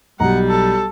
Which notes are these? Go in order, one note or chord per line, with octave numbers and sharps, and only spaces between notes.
B1 G3 F#5 A#5
A4